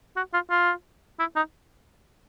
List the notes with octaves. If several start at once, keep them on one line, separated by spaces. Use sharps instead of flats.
F#4
F4
F4
E4
D#4